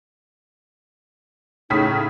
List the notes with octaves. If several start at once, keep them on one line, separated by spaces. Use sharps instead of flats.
A2 C#3 D#4 B6